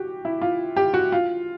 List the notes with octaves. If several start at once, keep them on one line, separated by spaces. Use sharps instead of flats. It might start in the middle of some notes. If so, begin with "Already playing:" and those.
Already playing: F#4 G4
E4
F4
G4
F#4
F4